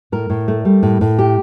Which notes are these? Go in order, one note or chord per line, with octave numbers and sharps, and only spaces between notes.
A2 A#4
A2
A3
G3
A2
A2
G4